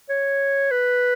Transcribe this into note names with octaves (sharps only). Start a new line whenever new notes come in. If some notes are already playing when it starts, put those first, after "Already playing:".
C#5
B4